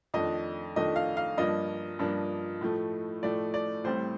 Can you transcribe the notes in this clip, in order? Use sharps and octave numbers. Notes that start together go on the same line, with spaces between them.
F2 D#3 A3 D4 D#5
F2 D#3 A3 D4 D#5
F5
F5
G2 F3 A#3 D4 D#5
G2 F3 A#3 D4
A2 F3 A3
A2 F3 A3 D5
D5
A1 A2 G3 C4 C5